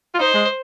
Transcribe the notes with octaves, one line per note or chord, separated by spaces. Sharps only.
F4
D#4 C5
G#3